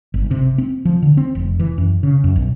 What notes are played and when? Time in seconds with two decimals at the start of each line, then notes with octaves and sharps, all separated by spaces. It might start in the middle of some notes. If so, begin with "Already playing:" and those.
0.14 G1
0.31 C3
0.58 C4
0.85 F3
1.02 D3
1.17 C4
1.35 F1
1.60 E3
1.78 F#2
2.03 C#3
2.24 F#2
2.36 B1